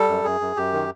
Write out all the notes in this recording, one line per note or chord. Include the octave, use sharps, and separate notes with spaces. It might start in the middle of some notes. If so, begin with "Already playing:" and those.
Already playing: G3 A4
F#2
F#2 G#4
F#2
F#2 G4
D#3